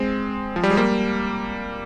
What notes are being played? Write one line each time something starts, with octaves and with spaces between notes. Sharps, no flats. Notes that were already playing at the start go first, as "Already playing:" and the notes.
Already playing: G#3 C4
F3
G3
G#3
G3 A#3